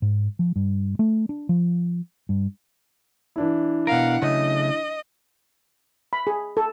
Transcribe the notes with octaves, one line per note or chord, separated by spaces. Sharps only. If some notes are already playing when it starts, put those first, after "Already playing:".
G#2
F3
G2
A3
D4
F3
G2
E3 D4 E4
B2 A#4 F5 F#5
C#3 F#3 A3 D#5
B5
G#4
A4